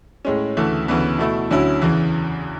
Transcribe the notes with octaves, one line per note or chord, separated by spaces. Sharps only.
A2 G#3 C#4
D2 C#3 E3 A3
D2 C#3 E3 B3
B2 A3 E4
D2 D3 F#3 C#4 E4
E2 C#3 E3